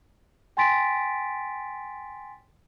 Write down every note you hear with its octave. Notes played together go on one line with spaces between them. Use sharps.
G5 G#5 C6 A6 B6 D7